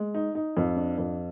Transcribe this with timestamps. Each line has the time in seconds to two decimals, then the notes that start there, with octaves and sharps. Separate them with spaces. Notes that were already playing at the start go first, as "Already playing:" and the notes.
Already playing: G#3
0.14 D#4
0.35 D#4
0.57 F2
0.77 D4
0.98 F2